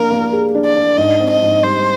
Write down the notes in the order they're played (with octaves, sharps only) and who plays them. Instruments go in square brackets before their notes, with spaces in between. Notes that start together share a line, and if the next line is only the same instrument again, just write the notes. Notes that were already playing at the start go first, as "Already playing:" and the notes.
Already playing: [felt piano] A#3 D4 [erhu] A#4
[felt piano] A#3
G#4
D4
[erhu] D5
[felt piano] D4
[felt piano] G#2 [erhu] D#5
[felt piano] C4
[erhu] D#5
[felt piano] G#2
[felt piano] G3 [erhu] C5